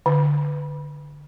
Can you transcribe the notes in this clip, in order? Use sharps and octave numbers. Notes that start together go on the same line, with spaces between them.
D3